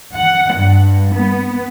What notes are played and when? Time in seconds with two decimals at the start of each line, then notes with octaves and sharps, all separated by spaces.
0.15 F#5
0.54 G2
1.14 B3